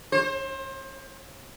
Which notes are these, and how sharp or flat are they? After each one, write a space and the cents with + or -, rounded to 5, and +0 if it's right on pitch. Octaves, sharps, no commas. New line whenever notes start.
C5 +30